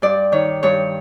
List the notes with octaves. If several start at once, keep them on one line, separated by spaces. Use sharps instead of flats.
G2 D5
D#3 C#5
G2 C#5